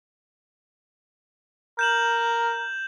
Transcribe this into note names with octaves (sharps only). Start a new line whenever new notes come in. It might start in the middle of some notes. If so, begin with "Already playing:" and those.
A#4 G6 E7 F#7